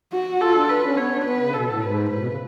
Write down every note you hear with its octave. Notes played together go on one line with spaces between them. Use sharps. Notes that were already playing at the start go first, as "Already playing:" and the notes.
F#4
F4 A4
D4
D4 B4
C#4
B3 C#5
D4
B3 B4
C#3
B2 A4
A2
G#2 B4
A2 B4
B2
C#3